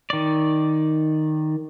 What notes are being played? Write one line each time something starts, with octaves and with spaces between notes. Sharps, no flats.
D#3 D5